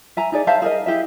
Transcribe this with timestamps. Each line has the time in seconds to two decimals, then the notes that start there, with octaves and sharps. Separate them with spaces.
0.17 E5 G#5 A#5
0.32 D#4 G#4 D5
0.47 C5 E5 F5 A5
0.62 G#4 A#4 D#5
0.86 E4 G4 G#4 E5